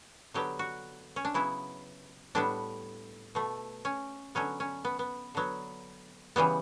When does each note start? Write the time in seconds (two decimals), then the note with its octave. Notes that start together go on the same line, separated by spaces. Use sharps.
0.34 D3 F#3 B3 G4
0.59 F#4
1.16 C#4
1.25 D4
1.34 C#3 F#3 B3 E4
2.35 A2 G3 B3 D4
3.35 B2 A3
3.85 C#4
4.35 D3 F#3 B3 C#4
4.60 C#4
4.85 B3
4.99 B3
5.35 D3 F#3 B3
6.36 C#3 E3 G3 B3